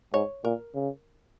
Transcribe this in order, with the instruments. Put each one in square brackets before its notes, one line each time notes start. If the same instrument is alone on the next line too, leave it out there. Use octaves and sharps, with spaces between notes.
[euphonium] G#2 [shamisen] C#5
[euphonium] A#2 [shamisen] A#4
[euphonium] C#3